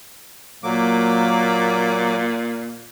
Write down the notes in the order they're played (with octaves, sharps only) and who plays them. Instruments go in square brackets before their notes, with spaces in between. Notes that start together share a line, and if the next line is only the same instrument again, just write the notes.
[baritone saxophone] A#2 [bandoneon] F#3 A#3 D6